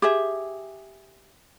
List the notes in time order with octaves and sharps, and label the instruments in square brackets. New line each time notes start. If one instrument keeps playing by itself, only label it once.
[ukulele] G4 G#4 E5